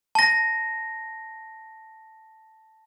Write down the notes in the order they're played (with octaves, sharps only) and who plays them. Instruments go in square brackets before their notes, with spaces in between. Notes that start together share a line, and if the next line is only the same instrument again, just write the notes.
[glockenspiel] A5 A#6